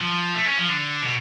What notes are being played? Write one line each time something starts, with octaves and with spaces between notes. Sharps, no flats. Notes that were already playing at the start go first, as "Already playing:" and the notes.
F3
A3
C#4
F3
D3
B2